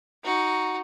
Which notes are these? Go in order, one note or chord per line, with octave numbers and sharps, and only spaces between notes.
D#4 F#4